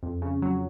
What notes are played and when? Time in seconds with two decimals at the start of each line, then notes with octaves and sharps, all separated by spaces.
0.03 F2
0.22 C#3
0.42 F#3